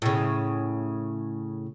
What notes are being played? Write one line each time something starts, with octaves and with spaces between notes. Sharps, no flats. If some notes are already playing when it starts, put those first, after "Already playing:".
A2 C#3